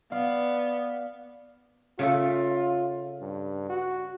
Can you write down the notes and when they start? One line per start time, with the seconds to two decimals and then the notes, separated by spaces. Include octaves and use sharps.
0.12 B3 D5 F5
1.99 C#3 A3 F4 A4
3.21 G2
3.69 F#4